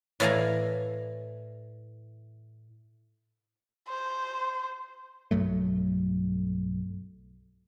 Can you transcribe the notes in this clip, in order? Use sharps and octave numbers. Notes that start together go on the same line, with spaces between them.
A2 E3 D5 F5 G#5 A#5
C5
B1 G2 F#3 A3